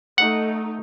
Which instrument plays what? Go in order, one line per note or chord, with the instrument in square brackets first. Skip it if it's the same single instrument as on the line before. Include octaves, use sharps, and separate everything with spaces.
[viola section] A3 D#4 [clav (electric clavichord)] F#5